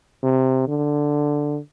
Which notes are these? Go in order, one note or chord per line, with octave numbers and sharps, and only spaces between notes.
C3
D3